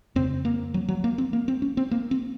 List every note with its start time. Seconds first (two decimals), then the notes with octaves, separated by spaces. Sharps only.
0.15 F2 C#3 C4
0.45 A#3
0.74 F#3
0.88 F#3
1.04 A#3
1.18 C4
1.33 A#3
1.48 C4
1.62 C#4
1.77 C4
1.91 A#3
2.11 C4